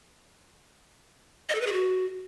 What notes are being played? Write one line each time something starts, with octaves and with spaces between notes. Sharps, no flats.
D#5
A4
B4
G#4
F#4